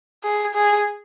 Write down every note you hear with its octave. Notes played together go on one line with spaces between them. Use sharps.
G#4
G#4